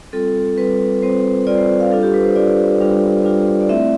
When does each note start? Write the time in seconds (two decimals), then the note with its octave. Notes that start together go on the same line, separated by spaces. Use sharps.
0.13 G3 C4 F4 A4
0.58 G3 C4 F4 B4
1.02 G3 C4 F4 C5
1.47 G3 C4 F4 D5
1.58 C5
1.80 F5
1.91 G3 D4 F4 A4
2.03 G4
2.14 B4
2.25 C5
2.36 G3 D4 F4 D5
2.80 G3 D4 F4
3.25 G3 D4 F4
3.61 D5
3.69 A3 C4 E4 E5